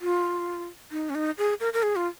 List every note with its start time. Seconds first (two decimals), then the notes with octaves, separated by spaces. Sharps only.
0.01 F4
0.92 D#4
1.10 C#4
1.15 D#4
1.38 G#4
1.60 A#4
1.73 A#4
1.83 G#4
1.96 F4